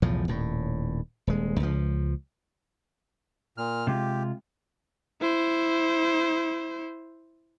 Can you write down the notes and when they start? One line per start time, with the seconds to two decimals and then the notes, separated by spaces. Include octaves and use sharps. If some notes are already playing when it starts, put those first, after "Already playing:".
0.02 B1 E2 A2 F3
0.28 D#1 A2
1.27 D#1 G#3
1.60 C#2 F3
3.58 A#2 F6
3.87 C3 G#3 F4 G4
5.21 E4 C5